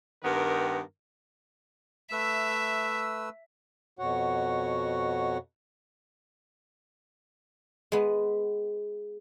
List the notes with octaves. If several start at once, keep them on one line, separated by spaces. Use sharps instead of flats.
G2 D#3 B3 A#4
A3 B4 E5 E6
F2 B2 F#4 C#5 F#5
G#3 B3